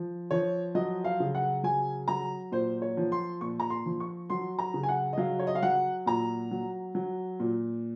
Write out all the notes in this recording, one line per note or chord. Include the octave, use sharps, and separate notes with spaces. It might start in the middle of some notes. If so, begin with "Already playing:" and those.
Already playing: F3
F3 C#5
F#3 D#5
F5
C#3
F#5
F#3 G#5
F#3 A#5
A#2 C5
C#5
F3
C6
A#2 C#6
A#5
C6
F3
C#6
F#3 C6
A#5
C#3
G#5
F#5
D#5
F#3 F5
C#5
D#5
F5
F#3 F#5
A#2 A#5
F#3
F#3
A#2